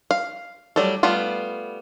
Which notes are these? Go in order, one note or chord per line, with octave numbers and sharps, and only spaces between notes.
F5
F#3 G3 A3 A4
G3 A3 B3 F4